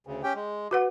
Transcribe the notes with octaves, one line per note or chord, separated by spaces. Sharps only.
D2 C#3
C#4 G4 G5
G#3
F#4 B4 F#5